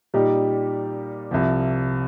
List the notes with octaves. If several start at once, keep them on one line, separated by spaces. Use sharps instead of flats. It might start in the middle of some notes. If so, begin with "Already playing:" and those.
A#2 G3 D#4 G4
C2 C3 F3